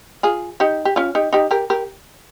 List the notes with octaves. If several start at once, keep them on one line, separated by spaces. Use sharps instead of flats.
F4 G#4
D#4 G4
G4
C#4 F4
D#4 G4
D#4 G4
G4 A#4
G4 A#4